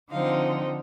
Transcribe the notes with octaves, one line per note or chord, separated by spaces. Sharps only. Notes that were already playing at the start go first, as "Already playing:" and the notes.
D3 F3 C4 D#4 F5